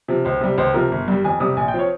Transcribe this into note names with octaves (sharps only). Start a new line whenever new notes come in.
C3 F3
C#2 C5
C3 G3
C#2 C5
C3 F3 A#4
G1
G2 G3
F2 G#5
C3 G3 D#6
A#1 G#5
G5
F3 C4 C#5